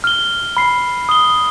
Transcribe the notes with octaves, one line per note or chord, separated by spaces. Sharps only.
F6 G7
B5 C7
D#6 G7